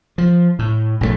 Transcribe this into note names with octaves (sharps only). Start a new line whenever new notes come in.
F3
A2
A#1 G#2 B2 A3